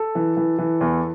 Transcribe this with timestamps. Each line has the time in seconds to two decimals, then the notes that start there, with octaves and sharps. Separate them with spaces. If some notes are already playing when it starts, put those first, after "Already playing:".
Already playing: A4
0.15 E3
0.37 E3
0.58 E3
0.81 E2